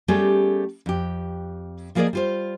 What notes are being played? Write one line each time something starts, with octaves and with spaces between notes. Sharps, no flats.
G3 A3 B3 C#4 G4 G#4
F2 G4
F3 A#3 G#4 A#4 D5 D#5
G3 F4 C5